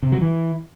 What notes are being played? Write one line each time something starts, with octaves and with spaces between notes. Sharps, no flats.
C3
F#3
E3